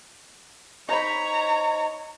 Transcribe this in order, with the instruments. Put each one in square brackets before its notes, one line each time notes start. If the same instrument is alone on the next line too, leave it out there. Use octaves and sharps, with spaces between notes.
[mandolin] D#4 C5 B5 [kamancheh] C#5 A#5